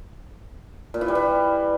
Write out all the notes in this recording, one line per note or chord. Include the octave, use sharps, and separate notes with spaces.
A#2
E3
G3
E3